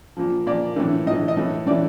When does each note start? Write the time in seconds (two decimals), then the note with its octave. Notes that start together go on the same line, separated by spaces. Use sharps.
0.17 A#2 F3
0.47 A#2 F3 D5
0.76 A2 E3
1.06 A2 E3 D#5
1.28 D#5
1.37 A2 E3
1.67 A2 D5
1.71 E3